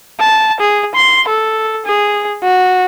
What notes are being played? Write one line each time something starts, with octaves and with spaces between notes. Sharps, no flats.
A5
G#4
C6
A4
G#4
F#4